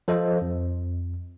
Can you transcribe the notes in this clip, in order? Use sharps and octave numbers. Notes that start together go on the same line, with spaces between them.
F3 A4 C5 D#5
F2